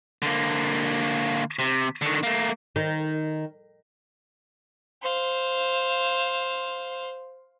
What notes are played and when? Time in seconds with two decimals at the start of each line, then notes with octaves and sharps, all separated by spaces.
0.22 D3 A#3
1.59 C3
2.02 D3 D#3
2.23 A3 A#3
2.76 D#3
5.02 C5 F5